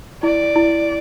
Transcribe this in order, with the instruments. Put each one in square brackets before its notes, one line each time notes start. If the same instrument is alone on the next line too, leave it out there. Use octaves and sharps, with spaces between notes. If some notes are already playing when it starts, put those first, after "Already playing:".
[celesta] E4 [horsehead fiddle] D5
[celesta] E4